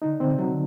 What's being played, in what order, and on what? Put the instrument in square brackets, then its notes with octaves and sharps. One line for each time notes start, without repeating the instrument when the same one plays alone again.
[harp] D3 [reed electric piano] D#4
[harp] D3 [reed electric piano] C4
[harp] C3
[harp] D3 [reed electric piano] F#3